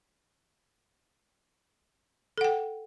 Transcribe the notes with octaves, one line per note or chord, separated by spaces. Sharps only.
A4 F#5 G5